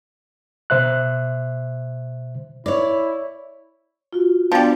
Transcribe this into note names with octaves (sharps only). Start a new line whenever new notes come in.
B2 C5 E5 F#6
E4 C#5 D5
F4 F#4
F3 G3 B3 D4